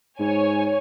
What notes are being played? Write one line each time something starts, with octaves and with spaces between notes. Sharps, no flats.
G#2 C#5 G#5